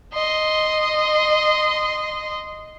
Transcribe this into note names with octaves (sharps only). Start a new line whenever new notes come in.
D#5 C6